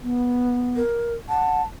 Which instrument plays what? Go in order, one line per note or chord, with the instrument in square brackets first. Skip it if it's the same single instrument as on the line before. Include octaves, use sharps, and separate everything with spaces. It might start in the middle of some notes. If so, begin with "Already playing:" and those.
[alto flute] B3
[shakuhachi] A#4
[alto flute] F#5 [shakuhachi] A5